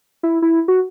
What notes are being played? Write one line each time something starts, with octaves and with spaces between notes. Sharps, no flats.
E4
E4
F#4